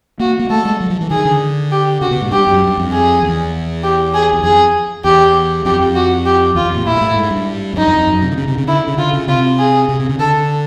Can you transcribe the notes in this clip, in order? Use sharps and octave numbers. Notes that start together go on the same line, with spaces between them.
A#3 F#4
A#3
A3 A4
G#3
F#3
F3
E3
D#3 G#4
D3
G4
C#3 F#4
B2
G#2
G2 G4
F#2
G2
F2
G#4
E2
G4
G#4
E2
F2 G#4
E2 G4
F2 G4
F2
F#4
G4
E2 F4
F2
A#2
A#2 E4
A#2
A2
G#2
G2
F2
F#2 D#4
F2
F2
F#2
C3
D3
C#3
C3
C#3
D3 E4
C#3
D3 F4
C#3
C3 F4
G#4
C3
C3
C#3
D3 A4